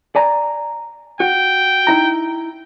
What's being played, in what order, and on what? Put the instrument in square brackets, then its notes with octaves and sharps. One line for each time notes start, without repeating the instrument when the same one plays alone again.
[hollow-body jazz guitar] D5 G#5 A#5
[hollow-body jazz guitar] F#4 [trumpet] G5
[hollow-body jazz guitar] D#4 E4 A#5